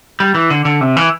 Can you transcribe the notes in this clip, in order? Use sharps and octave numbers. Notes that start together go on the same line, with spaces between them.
G3
E3
D3
D3
C3
E3